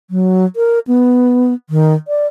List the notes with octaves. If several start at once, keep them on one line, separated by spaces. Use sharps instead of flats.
F#3
A#4
B3
D#3
D5